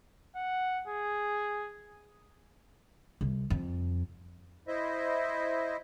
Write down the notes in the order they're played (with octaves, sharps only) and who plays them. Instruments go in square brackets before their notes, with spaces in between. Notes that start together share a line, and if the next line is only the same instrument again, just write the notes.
[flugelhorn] F#5
G#4
[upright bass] C2
F2
[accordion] E4 C5 D#5 E5